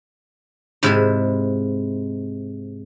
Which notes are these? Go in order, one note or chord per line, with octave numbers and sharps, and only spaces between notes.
G#2 C3 E4